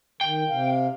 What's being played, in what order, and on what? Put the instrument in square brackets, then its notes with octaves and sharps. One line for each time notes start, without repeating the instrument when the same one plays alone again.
[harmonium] D#3 [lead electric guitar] G5
[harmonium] C3 F5